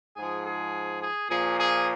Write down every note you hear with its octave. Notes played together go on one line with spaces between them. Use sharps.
G#2 F3 G#4
G#4
G#4
A#2 F3 G#4
G#4